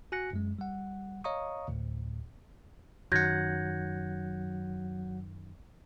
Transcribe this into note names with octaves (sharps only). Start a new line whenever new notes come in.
F#4 G#5 F#6 A#6 C#7
F#2 G#3
G3 F#5
C#5 D#5 F5 A#5 C#6 D#6
D2 A2
F#2 D#3 F#3 F#5 G6 G#6 A#6